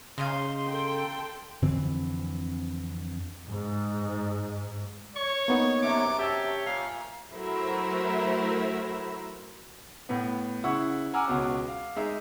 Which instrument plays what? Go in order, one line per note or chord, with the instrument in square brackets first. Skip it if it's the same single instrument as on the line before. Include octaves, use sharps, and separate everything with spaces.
[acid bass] C#3 [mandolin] D#4 D#5 F5 [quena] C6
[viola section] A4 G5
[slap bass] F2 D3 E3 C4
[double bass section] G#2
[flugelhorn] C#5 [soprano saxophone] C#6
[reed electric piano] A#3 B3 D#4
[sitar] F#2 C3 D4 [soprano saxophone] D6
[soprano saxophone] G4 [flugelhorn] C#5 [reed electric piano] E5 A5 E6
[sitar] A#2 [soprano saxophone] F5
[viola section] F#3 A3 E4 A#4 C5 E5
[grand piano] A2 B3
C#3 E4 F#5 C#6
F#5 G#5 A#5 D6 E6 F6
C#2 B2 C#4
F5
G#3 D#4 E5